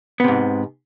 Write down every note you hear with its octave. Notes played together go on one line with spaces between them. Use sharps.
G#2 C3 B3